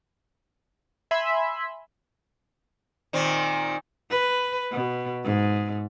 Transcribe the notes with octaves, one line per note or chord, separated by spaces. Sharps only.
E5 G#5 B5 C6
A#2 D#3 C4
B4
B2
G#2